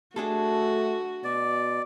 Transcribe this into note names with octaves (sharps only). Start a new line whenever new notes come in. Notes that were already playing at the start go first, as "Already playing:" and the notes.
A3 D4 F#4 G#4 A4
B2 D5